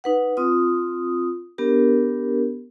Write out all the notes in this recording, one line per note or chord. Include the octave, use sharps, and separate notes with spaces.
D#4 B4 F#5
C4 F4 D#6
B3 D4 G4 A#4